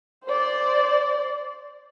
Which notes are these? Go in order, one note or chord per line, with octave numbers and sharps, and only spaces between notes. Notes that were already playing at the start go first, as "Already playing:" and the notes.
C5 D5